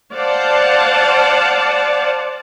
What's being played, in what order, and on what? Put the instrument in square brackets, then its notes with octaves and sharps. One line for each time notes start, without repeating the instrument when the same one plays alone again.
[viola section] C5 D5 F5 F#5 A5